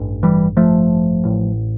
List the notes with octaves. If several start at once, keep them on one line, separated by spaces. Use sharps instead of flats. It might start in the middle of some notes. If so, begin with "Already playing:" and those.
Already playing: A1 G2
E3 G3
F3 A3
A1 A2